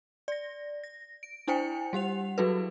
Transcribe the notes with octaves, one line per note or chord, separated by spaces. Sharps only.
D5 A#6
A#6
D7
D4 E4 C5 G5 G#5 C#7
G3 G4 F#5 F7
F#3 E4 F#4 G#4 A4 B4